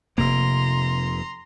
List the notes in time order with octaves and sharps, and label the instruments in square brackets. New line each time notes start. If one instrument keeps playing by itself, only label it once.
[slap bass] F1 C3 A#3 [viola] A#5 C6